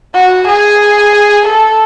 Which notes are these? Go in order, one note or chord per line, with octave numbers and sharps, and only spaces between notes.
F#4
G#4
A4